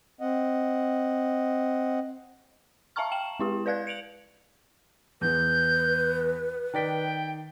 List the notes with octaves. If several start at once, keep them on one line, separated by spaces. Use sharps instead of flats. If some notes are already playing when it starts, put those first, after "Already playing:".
C4 D#5 F#5
E5 F5 A5 A#5 C#6 F6
G5 E7 F#7
G#3 E4 G4
B4 D5 F5 F#6 G#6
C#7 D7 F7 F#7
E2 E3 B4 G6
D#3 D5 G5 B6